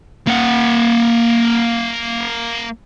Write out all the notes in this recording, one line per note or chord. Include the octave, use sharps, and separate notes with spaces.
A#3 F#5